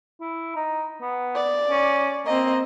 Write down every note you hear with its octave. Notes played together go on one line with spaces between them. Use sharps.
E4
D#4
B3
D5
C#4
A#3 C4 D#5